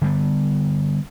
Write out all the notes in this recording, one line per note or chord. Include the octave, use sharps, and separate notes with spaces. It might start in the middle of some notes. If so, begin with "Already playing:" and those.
D3 G3 B3